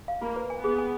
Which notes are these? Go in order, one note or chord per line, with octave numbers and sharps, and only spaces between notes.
F5
A#3 F4
B4
G#5
B3 G#4
G#5